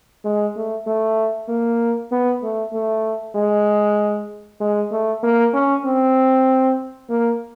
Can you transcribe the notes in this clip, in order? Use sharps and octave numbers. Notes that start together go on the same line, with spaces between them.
G#3
A3
A3
A#3
B3
A3
A3
G#3
G#3
A3
A#3
C#4
C4
A#3